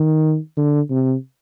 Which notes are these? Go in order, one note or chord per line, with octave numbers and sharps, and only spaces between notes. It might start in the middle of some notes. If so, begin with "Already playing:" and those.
Already playing: D#3
D3
C3